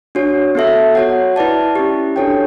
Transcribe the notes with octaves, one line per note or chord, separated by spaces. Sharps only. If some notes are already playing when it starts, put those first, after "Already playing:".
D4 F#4 C#5
B3 F#4 A4 E5
F#4 C#5 F#5
E4 B4 D5 A5
C#4 E4 G4
D4 F#4 A4 C#5 G5